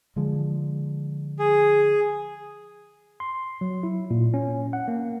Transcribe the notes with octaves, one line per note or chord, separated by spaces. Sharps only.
D3 F3 G#3
G#4
C6
F#3
E4
A#2
C#4
F#5
A#3